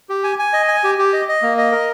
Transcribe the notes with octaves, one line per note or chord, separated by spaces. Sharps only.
G4
G#5
G#5
D#5
G#5
G4
G4
D#5
D#5
A#3
D#5
A#4